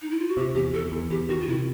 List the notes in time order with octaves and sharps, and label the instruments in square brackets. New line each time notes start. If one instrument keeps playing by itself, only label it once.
[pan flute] D#4
E4
F4
F#4
[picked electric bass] C3 [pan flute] G4
[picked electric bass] E2 [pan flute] G4
[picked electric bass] E2 [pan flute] A4
[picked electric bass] E2
[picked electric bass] E2 [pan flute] G4
[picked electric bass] D#3 [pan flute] F#4
[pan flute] F4
[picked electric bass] C3 [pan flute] E4